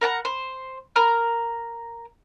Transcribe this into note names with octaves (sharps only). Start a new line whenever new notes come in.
A#4 F#5 A5 A#5
C5
A#4 A#5 F6